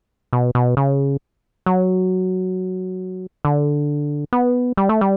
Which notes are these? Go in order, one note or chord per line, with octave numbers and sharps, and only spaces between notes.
B2
B2
C#3
F#3
D3
B3
G3
A3
G3